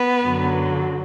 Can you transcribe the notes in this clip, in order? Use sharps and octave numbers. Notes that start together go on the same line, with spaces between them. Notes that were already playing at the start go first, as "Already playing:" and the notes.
Already playing: B3
F#2 D3 F#3